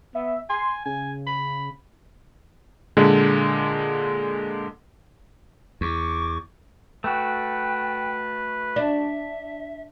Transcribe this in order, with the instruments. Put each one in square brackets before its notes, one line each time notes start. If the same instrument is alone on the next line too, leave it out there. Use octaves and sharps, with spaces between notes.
[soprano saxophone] B3 [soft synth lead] E5
[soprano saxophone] G#5 [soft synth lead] C6
[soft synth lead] C#3 [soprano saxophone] G#5
[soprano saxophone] B5
[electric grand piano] A#2 D3 G#3
[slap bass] E2 [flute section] C#6 D6
[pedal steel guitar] A3 F#4 [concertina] B4 [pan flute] G5
[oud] D4 [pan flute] E5